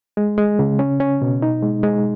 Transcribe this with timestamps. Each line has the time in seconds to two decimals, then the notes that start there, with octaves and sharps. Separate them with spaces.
0.17 G#3
0.38 G#3
0.59 C#3
0.79 C#4
1.00 C#4
1.22 B2
1.42 D#4
1.63 G#3
1.83 G#3